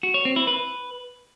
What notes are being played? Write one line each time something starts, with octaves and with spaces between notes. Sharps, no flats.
F#4
C#5
C4
E4
B4